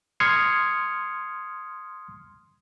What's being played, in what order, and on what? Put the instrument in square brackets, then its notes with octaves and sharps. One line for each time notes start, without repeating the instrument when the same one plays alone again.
[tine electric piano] C6 D#6 F6 G#6 C7 C#7